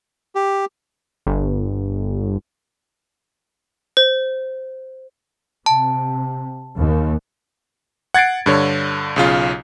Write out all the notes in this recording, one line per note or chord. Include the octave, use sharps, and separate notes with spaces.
G4
G1
C5
C3 A5
D#2
F#5 G#6 A6 C7 D7
G2 D3 C#5
B1 C#3 F4